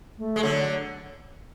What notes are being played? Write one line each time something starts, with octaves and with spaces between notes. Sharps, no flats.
A3
G#3
D3 F#3